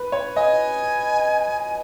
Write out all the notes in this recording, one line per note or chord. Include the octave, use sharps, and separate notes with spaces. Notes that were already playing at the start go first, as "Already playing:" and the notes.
Already playing: B4
C#5
D#5 G#5